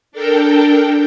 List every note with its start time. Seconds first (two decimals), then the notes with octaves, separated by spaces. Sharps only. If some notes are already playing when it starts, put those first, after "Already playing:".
0.12 D4 A4 A#4 G5